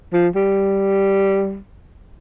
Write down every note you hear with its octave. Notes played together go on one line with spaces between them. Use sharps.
F3
G3